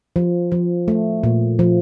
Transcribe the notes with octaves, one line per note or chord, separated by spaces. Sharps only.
F3
F3
A3
A#2
F3